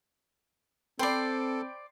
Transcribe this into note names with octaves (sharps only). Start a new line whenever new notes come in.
C4 A4 C5 D5 G5 B5 C7